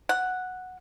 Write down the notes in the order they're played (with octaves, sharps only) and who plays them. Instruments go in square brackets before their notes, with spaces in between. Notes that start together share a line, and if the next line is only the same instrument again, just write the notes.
[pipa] F#5